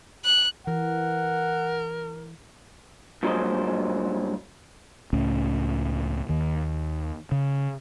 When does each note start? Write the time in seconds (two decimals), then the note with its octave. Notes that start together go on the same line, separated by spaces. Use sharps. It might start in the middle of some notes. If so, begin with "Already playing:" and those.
0.25 F#6
0.67 E3 A#4 F#5
3.23 G2 A#2 F#3 G#3 C5 D#5
5.13 C#2 A2 A3 C#4
6.29 D#2 D#3
7.32 C#3